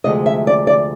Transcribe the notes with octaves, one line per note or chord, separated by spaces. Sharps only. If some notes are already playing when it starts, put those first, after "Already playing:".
D2 C3 F3 G#3 D#5
E5
D5
D5